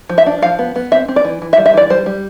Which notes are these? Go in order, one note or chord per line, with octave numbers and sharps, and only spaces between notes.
F3
E5
D4
F3 F5
B3
B3
C4 E5
C4
D5
E3
E3
E5
G3
E5
E3 D5
G3 C5
G3